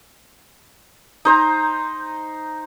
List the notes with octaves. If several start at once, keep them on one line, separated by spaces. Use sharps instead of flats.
D#4 C5 A#5